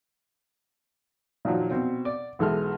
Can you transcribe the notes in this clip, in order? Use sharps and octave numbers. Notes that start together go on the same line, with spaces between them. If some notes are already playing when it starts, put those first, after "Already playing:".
A#2 D#3 F3 F#3
B2 C4
D5
B1 E3 G#3 A4 F6